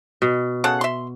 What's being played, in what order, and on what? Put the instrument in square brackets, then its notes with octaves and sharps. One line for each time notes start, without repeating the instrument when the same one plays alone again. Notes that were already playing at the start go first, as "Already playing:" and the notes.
[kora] B2
[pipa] C#3 A4 F#5
E5 C6